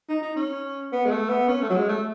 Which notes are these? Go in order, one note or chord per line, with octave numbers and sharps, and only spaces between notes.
D#4
D#4
C#4
B3
G#3
A3
B3
C#4
A3
F#3
G#3
A3